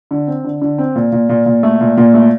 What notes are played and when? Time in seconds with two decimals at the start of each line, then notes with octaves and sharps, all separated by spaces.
0.11 D3
0.27 C4
0.44 D3
0.62 D3
0.78 C4
0.95 A#2
1.12 A#2
1.29 A#2
1.46 A#2
1.63 A3
1.81 A#2
1.97 A#2
2.14 A3